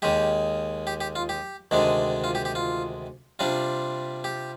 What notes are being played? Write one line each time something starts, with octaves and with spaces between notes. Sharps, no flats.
D#2 D#3 G#3 G4
G4
G4
F4
G4
D2 C3 D#3 G#3 D4
F4
G4
G4
F4
C3 G3 D4 F4
G4